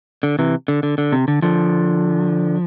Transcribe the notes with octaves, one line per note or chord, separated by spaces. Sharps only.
D3
C3 E3
D3
D3
D3
C3
D3
D3 F3